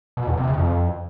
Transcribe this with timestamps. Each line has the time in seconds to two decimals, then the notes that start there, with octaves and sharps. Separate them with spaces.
0.17 B2
0.27 E2
0.37 C3
0.47 C#3
0.58 F2